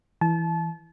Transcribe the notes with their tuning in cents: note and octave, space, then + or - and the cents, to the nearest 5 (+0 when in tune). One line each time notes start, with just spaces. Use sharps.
E3 +5 A5 -30